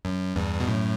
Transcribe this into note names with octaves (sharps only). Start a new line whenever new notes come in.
F#2
E2 G2
B2
F#2 A2